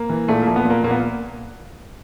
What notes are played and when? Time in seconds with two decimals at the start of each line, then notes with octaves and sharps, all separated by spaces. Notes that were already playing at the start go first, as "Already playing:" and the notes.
Already playing: A#3
0.09 E3
0.28 A#2 A3
0.42 F3 A#3
0.56 B3
0.65 A#2
0.70 A#3
0.84 A#2 A#3
0.91 B3